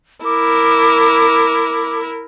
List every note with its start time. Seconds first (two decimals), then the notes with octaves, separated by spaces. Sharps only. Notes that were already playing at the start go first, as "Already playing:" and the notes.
0.25 E4 A#4 D6